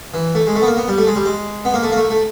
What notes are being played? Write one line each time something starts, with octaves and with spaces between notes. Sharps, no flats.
E3
A3
G#3
A3
B3
A#3
B3
G3
A3
G#3
G3
G#3
B3
A#3
A3
A#3
A3
A3